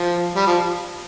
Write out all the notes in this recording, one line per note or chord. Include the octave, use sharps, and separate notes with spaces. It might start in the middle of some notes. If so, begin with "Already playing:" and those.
Already playing: F3
G3
F3